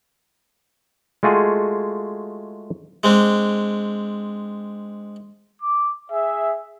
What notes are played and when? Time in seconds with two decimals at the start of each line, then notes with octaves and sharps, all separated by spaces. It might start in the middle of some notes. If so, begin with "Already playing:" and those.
1.23 G#3 A3 F4 F#4 G#4
3.03 G#3 C4 D4
5.61 D6
6.11 G#4 E5